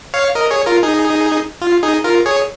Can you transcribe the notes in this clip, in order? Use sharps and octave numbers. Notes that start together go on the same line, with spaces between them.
C#5 F5
A#4 D#5
G#4 C#5
F4 A#4
D#4 G#4
F4
D#4 G#4
F4 A#4
G#4 C#5